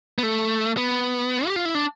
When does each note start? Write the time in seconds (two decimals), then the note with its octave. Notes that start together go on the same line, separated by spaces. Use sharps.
0.18 B3
0.23 A3
0.77 B3
1.48 G4
1.56 F4
1.65 E4
1.75 D4